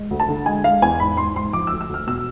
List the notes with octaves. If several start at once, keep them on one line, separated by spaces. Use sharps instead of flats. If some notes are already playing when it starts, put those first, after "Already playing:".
Already playing: G#3
D2
A5
D3
G#3 G#5
G#3 F5
E2 G#5
G#2 B5
G#2 C6
G#2 C6
F3 D6
D2 E6
E6
D2 F6
B2 E6